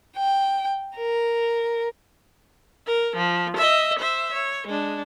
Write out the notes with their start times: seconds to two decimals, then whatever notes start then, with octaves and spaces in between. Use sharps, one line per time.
0.18 G5
0.97 A#4
2.86 A#4
3.16 F3
3.57 D#5 E5
3.99 C5 E5
4.33 C#5
4.67 G#3 D4